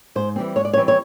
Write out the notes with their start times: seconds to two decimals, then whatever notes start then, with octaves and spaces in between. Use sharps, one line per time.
0.15 G#2 C5
0.36 E3 G3 C4
0.56 G#2 C#5
0.65 D5
0.73 C#5
0.77 E3 G3 C4
0.88 C#5